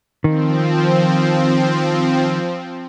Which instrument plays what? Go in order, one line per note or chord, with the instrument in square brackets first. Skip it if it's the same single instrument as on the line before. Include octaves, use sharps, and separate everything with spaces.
[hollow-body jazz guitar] D#3 [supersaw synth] F3 C4